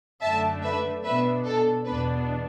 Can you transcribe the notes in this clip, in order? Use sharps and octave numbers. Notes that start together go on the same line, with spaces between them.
F#2 D3 A3 D4 E5 A5
B4 E5
B2 B3 D4 B4 E5
A4
E2 B2 B3 D4 B4